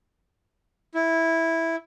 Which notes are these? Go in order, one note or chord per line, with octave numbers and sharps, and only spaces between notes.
E4